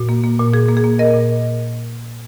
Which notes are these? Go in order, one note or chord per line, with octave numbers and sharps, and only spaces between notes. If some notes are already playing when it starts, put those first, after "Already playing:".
Already playing: A#2 F#4
A#3
A#3
A#2
A#2 G#4
A#3
G#4
A#3
A#2 A#4 D#5
A#2